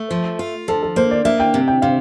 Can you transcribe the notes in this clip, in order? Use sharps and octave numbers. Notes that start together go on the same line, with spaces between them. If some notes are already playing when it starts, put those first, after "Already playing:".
Already playing: A3
F3
F4
F3 A4
A4
A#3 C5
D5
A#3 E5
G5
C3
G5
C3 F5